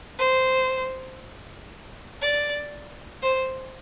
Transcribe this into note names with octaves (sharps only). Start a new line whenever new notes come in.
C5
D5
C5